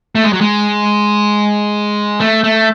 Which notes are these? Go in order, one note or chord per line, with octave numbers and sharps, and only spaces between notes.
A3
G#3
F#3
G#3
A3
A3